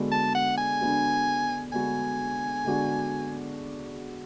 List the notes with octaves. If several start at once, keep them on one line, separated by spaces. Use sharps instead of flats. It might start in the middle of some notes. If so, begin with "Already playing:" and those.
Already playing: D3 G#3 B3 D4 F#4
A5
F#5
G#5
D3 G#3 B3 D4 F#4
D3 G#3 B3 D4 F#4 G#5
D3 G#3 B3 D4 F#4